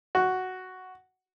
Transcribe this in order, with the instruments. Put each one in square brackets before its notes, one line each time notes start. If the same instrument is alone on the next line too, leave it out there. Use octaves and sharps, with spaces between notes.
[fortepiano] F#4